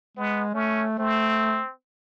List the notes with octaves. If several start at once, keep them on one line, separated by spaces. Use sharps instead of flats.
G#3 B3
A3 C#4
A3 C4